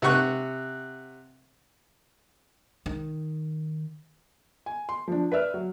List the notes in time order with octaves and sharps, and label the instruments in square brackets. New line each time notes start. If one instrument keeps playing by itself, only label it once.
[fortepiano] C3 F#5 C#6 F#6
[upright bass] D#3
[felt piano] G#5
C6
F3 D4
B4 D5 E5 F6
F#3